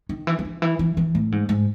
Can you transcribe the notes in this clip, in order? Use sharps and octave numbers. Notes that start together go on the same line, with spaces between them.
D#3
E3
E3
D#3
E3
E3
E3
A2
G#2
G#2